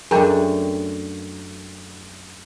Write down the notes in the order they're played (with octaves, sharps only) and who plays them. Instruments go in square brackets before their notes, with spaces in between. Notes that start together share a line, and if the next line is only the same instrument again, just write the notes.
[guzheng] F#2 A3 D4 [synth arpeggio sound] G#4 A#4 G5